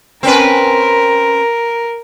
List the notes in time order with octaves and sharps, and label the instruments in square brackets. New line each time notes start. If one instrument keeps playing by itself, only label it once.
[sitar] C4 C#4 B4 [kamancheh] A#4